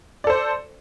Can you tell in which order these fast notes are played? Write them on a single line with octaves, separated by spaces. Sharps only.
D5 A4 C5